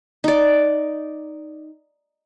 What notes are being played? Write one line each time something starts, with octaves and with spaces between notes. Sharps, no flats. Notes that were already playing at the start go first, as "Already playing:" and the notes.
D#4 D5